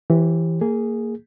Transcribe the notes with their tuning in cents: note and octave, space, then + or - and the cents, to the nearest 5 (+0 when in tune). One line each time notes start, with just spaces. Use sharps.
E3 +0 G4 +0 C5 +40
A#3 -20 G#4 +0